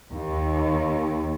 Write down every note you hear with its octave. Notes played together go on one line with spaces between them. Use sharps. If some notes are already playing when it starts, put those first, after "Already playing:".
D#2